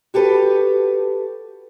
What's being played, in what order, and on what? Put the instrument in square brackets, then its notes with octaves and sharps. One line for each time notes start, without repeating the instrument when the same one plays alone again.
[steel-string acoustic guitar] F#4 G4 A4 B4